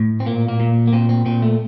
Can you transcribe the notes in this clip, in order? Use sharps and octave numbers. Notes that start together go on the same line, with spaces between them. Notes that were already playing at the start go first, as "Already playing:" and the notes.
Already playing: A2
C4
A#2 A#3
A#3
A#2
A#3
A#2 C4
C4
A#2 C4
A3